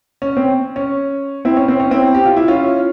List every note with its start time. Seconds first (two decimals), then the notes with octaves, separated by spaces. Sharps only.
0.22 C#4
0.37 C4
0.76 C#4
1.45 C4 E4
1.57 C#4
1.68 C4
1.80 C#4
1.91 C4 E4
2.15 G4
2.25 F4
2.37 E4
2.48 C#4 F4